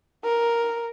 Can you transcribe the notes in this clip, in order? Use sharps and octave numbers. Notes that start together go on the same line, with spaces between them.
A#4